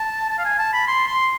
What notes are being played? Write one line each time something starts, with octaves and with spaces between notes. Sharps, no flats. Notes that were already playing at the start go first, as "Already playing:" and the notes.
Already playing: A5
A5
F5
G#5
A5
B5
C6
C6